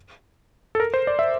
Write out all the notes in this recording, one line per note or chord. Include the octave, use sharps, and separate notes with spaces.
A4
A#4
C5
D5
E5